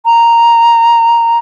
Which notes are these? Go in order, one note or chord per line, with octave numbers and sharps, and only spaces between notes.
A#5